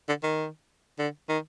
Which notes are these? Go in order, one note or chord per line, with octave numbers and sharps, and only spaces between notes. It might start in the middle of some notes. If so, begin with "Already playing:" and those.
D3
D#3
D3
D#3